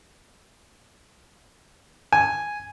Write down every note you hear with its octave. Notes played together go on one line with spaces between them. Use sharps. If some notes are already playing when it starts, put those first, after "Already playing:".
G#5